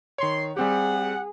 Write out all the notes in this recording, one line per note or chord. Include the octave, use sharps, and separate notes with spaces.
D#3 C#5 C6
G3 C4 G4 G#4 F#5